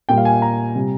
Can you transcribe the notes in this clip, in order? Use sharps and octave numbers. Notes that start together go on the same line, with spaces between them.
A#2 G3 G5
F5
G#5
A#5
C3 G3